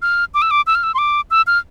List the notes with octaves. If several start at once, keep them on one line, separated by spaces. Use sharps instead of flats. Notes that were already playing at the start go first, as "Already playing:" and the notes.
F6
D6
E6
D6
E6
F6
E6
C6
D6
E6
F6